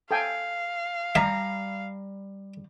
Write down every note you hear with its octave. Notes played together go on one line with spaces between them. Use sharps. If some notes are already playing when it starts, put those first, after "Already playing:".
A4 F5 G5 G#5
G3 E5 A#5